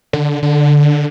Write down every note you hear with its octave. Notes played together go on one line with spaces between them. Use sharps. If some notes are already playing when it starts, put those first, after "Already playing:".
D3
D3